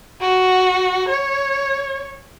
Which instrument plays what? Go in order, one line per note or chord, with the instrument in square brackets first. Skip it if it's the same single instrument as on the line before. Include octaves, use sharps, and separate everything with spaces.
[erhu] F#4
C#5